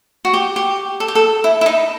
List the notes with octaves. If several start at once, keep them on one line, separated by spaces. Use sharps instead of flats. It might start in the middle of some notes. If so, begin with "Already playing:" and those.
F#4
G4
G4
A4
G4
A4
E4
E4
D#4